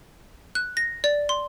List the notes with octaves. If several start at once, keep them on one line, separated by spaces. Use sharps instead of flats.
F#6
A#6
D5
C6